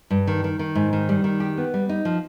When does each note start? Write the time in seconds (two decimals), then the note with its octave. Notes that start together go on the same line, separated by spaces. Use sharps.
0.10 G2
0.27 D#3
0.44 D#3
0.59 D#3
0.75 G#2
0.93 D#3
1.09 G3
1.24 D#3
1.40 G4
1.57 B3
1.74 G3
1.89 D#4
2.05 F3